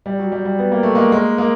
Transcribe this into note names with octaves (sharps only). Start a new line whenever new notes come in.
G3
F#3
G3
G3
B3
A#3
A3
G#3 A#3
G#3 A#3
G#3 A#3